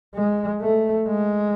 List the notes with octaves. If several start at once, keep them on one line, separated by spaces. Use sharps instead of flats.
G#3
A3
G#3